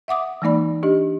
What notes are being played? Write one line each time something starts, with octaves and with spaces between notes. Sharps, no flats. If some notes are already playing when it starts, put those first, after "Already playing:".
E5 F#5 D6 D#6
E3 G#3 A#3 D#4 D5 B5
D4 G4 D#5